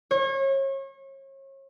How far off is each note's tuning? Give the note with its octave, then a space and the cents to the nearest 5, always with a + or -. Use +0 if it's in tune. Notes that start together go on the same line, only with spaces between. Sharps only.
C#5 -35